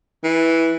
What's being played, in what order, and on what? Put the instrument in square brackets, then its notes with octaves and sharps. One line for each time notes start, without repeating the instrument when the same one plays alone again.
[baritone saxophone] E3